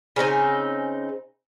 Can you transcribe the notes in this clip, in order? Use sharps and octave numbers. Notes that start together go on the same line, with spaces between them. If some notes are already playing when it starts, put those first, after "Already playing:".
C#3 C4 D#4 G#5